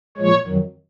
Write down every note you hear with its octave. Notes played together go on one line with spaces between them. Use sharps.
A#2 F3 G#3 C#5
F2 D#3 F#3